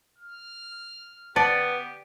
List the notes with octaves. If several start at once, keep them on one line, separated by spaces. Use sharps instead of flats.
F6
B3 G4 D5 A5